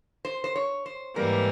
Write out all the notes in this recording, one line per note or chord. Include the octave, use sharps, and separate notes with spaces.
C5
C5
C#5
C5
G#2 E3 G3 A#3 A#4